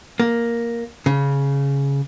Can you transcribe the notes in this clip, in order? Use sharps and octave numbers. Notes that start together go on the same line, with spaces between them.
A#3
C#3